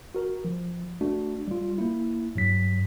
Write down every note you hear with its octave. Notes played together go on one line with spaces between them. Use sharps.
F#4 A#4
F3
A3 D4 F#4
G3 F4
A#3 E4
G2 F#3 B6